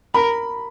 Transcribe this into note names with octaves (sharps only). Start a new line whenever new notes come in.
A#4 B5